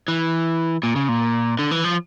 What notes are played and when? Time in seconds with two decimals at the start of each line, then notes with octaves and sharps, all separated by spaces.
0.08 E3
0.83 A#2
0.96 C#3
1.09 A#2
1.59 D3
1.71 E3
1.84 F3